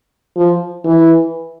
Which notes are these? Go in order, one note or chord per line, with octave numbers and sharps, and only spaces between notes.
F3
E3